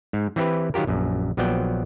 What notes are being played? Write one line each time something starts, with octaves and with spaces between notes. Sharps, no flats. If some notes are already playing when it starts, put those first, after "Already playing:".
G#2
E3 C4 E4 G4 B4
D#3 F#3 F4 G4 A#4
A#1 F#2
A#1 F3 F#3 B3 D5 G5